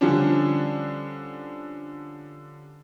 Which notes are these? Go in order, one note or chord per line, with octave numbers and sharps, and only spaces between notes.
D3 F3 G3 C#4 D4